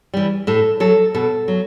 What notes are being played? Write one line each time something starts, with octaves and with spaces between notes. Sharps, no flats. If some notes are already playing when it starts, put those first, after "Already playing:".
E3 G3
A2 A4
F#3 A4
B2 A4
F#3